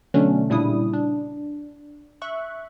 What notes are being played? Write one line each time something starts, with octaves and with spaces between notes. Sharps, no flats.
B2 D3 F#3 A3 C#4 D4
A#2 C#3 G3 D4 E4 D#6
D4
E5 C#6 F#6